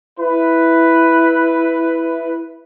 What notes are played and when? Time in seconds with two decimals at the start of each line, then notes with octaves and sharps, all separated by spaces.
0.20 E4 B4